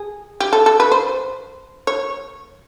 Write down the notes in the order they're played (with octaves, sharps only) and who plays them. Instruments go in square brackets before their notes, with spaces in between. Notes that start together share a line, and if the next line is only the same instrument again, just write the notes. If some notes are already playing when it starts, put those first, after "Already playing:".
Already playing: [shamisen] G#4
G4
A4
A4
B4
C5
C#5